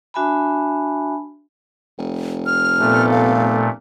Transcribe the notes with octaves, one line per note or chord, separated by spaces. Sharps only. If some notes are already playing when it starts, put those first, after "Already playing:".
D4 F#4 E5 G#5 A5 B5
F1
F6
A#2 A3 B3 A4
F5